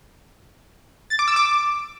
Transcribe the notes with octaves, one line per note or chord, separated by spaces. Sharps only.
A6
D6
E6
D6